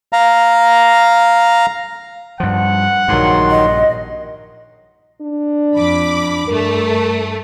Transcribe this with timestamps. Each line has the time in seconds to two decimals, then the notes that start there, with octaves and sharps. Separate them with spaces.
0.13 F5 A#5
2.40 G2 F3 F#5
3.08 A#1 G2 D#3 F#3 C6
3.50 D#5
5.21 D4
5.74 F2 B5 D6
6.48 G2 A3 A#4